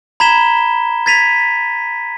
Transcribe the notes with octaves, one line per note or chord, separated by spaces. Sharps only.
A#5 B5 G#6 B6 E7 G7
G#6 A6 B6 D#7 F7